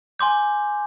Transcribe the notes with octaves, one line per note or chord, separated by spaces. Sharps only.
G#5 C6 D6 G6